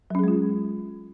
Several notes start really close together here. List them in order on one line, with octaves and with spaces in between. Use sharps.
F#3 C#4 G#4 G#3 F4